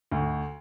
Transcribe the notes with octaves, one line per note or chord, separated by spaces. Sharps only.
D2